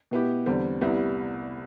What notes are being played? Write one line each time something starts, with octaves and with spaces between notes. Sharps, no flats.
B2 B3 E4 G4
E2 D3 G3 C4
C2 C3 G3 B3 E4